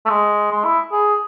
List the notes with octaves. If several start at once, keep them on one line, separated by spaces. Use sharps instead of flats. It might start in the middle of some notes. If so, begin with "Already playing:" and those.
A3
G#3
G#3
E4
G#4